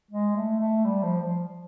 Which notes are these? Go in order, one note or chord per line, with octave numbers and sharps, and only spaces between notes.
G#3
A3
A3
G3
F3
F3